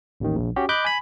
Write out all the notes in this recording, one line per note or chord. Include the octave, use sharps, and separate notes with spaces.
A1 D#2 D#3
A#1
C#4 F#4 G4
D#5 B5 D6 F#6 G6
G#5 B5